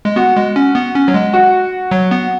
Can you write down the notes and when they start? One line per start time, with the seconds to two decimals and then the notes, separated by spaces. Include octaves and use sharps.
0.05 G#3
0.16 B3 F#4
0.36 G#3
0.56 C#4
0.75 B3
0.95 C#4
1.08 F#3
1.14 G#3
1.33 F#4
1.91 F#3
2.11 B3